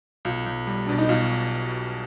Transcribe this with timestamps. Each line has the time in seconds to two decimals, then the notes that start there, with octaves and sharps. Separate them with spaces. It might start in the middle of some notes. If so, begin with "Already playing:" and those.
0.25 B1 F4
0.46 B1
0.67 G3
0.87 B2 D4
0.98 D#4
1.09 B1 F4